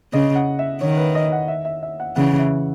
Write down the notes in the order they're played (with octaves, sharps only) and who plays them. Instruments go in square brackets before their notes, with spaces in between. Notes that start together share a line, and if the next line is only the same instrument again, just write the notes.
[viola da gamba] C#3 [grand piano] D#5
[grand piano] F#5
E5
[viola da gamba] D#3 [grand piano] C#5
[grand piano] B4
D#5
F#5
E5
E5
E5
F#5
[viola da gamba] C#3 E3 [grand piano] F#5
[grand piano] E5